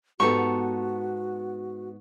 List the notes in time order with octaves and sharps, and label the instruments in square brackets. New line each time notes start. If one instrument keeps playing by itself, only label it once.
[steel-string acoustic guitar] G#2 B3 A#5 [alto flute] F#4 [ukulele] G4 A4 [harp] C#6